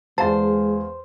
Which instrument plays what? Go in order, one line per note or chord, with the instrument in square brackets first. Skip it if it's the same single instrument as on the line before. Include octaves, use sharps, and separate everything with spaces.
[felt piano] E2 F5 G#5 [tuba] G#3 [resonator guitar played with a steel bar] C5 [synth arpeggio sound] A5